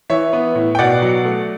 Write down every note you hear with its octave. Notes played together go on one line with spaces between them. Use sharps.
E3 C#5 E5
B3
A2
G5
B2 D5 F#5
F#3
A3